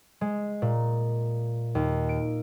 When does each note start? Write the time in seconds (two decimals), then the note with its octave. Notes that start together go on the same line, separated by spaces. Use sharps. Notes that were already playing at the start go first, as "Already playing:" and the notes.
0.21 G#3
0.62 A#2
1.75 D#2
2.09 D7